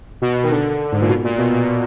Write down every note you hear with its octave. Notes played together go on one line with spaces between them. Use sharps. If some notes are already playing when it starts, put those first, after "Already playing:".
B2
D#3
D3
G#2
A#2
B2
A#2
B2
A#2